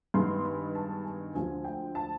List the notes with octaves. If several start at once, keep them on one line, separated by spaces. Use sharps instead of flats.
G2 D#3 G#3 B3 C6
B5
A5
G#5
D2 D3 F3 G#3 G#5
G5
A5